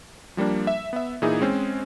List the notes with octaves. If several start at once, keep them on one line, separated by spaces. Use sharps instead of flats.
F3 G3 A#3 D4
E5
B3 E5
A#2 E3 D#4 E4 G#4
G#3 C4 C#4 C5